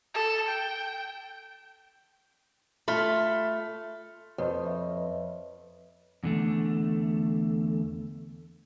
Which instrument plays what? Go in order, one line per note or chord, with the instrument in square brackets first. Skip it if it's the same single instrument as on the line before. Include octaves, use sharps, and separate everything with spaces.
[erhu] A4
G5
[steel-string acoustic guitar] A3 [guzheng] F4 B5
[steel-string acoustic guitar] F2 [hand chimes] B4 C#5 D#5
[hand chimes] E5
B4
[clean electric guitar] E2 D3 A3